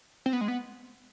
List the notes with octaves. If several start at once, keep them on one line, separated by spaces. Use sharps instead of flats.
C4
B3
G#3
B3